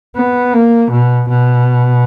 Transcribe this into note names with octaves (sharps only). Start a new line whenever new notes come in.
B3
A#3
B2
B2